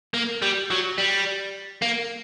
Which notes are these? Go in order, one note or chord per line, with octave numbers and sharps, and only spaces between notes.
A#3
G3
F#3
G3
A#3